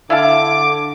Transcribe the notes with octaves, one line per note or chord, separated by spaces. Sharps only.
D3 E4 F5 A5 D6